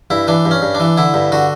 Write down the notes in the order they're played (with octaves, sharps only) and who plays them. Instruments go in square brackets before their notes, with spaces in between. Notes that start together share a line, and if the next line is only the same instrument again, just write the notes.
[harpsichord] G2 E4
E3 D4
G2
C#4
G2
D4
E3
D3 E4
G2
D3 F#4